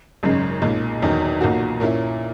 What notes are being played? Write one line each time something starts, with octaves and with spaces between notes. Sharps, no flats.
G#1 F#2 C#3 G#3
B1 A#2 G#3
E1 E2 D#3 F#3
B1 A#2 A#3 D#4 F#4
A#2 A#3 C#4 E4